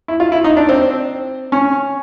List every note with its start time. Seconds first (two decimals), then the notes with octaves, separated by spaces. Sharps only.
0.08 E4
0.20 F4
0.32 E4
0.44 D#4
0.57 D4
0.69 C4
1.52 C#4